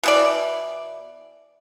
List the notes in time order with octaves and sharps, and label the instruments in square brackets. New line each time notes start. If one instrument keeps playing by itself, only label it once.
[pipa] B2 E3 D5